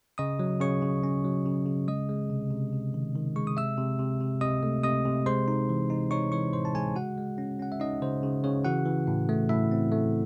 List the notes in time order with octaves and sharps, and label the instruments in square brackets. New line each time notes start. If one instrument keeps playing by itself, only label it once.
[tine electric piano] C#3 D#5 D#6
F#3
C#3 C#5 C#6
C#3
C#4
F#3
C#3
C#3
G#3 D#5 D#6
G#3
C3
C3
C3
D#3
D#3
G#3 C#6
D#6
C3 E5 E6
C3
C3
C3
C3 D#5 D#6
A3
C3 D#5 D#6
C3
G#3 C5 C6
D#4
E3
D#4
D#4 C#5 C#6
E3 C#5 C#6
A2 C5 C6
A5
G#3 G#4 G#5
C#3 F#4 F#5
G#3
C#4
C#4 F#5
E5
C#4 D#4 D#5
C#3 C5
C#3
C#3 C#5
E3 F#4 F#5
E3
A2
A3
A2 E4 E5
C4
A3